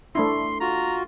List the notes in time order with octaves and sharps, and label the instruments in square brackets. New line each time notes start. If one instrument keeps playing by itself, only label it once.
[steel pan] A3 D4 E4 [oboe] C6
[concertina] F4 F#4 [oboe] A#5